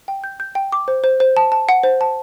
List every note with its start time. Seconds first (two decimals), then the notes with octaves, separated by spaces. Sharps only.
0.08 G5
0.24 G6
0.40 G6
0.55 G5
0.72 D6
0.88 C5
1.04 C5
1.20 C5
1.37 A5
1.52 A5
1.69 F#5
1.83 C5
2.01 A5